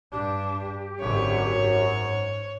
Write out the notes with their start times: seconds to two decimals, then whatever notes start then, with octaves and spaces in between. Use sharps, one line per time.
0.12 G2 D4 G4
1.01 G#1 F#2 D3 C#5
1.57 G#2